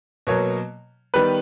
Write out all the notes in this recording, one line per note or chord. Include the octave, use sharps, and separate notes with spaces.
B2 F#3 A#3 C#5
D#3 G3 B3 B4